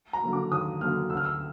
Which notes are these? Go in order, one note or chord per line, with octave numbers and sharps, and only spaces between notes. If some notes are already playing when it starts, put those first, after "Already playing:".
A#5
D3 F#3 A#3
D6
D#2 D#6
D3 F#3 A#3 F6
D2 E6
F6
E6